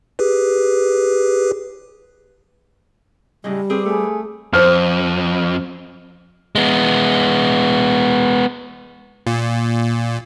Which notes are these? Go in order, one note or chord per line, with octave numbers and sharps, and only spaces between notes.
G4 G#4 B4
A2 C#3 G3 G#3
C4 G4 G#4 B4
A3 G#4
F2 C5 F6
G#3 B3
A#2